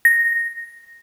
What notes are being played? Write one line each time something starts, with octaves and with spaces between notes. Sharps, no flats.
A#6